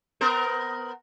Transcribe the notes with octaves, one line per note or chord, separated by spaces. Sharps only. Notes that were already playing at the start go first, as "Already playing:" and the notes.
B3 A#4 C5